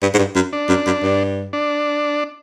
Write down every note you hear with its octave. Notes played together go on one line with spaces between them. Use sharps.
G2
G#2
G2
F#2
D4
F#2
F#2
G2
D4